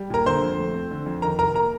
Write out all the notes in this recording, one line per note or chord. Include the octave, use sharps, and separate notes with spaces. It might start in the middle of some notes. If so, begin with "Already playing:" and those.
Already playing: G3
A#2 A#4 A#5
D3 C5 C6
F2
A3
C4
D3
F2
D#3 A#4 A#5
C3 A#4 A#5
A#3 A#4 A#5